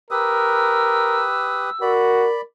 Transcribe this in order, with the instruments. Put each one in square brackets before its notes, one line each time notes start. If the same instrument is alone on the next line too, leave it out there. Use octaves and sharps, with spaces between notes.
[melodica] G4 B4 D#6 [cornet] A#4 [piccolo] E6
[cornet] F#4 [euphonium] A#4 [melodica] D5 B5